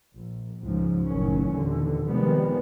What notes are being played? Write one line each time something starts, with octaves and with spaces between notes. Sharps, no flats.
A#1
C#2 G#2 F3
F#1 A2 D#3 F#3 C#4
D#2 A#2 D3 E3
C3 D#3 F3 G3 G#3 B3